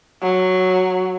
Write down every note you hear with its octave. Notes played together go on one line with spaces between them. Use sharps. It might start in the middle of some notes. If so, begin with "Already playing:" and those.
F#3